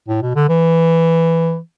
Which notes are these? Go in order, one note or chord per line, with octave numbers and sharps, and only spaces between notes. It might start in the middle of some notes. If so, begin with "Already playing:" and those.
A2
B2
D3
E3